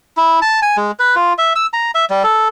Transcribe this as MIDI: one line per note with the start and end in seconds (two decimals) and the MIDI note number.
0.17 0.40 64
0.42 0.60 81
0.62 0.77 80
0.77 0.91 56
0.99 1.15 71
1.16 1.33 65
1.38 1.53 76
1.55 1.66 88
1.73 1.91 82
1.95 2.05 76
2.10 2.23 55
2.24 2.48 69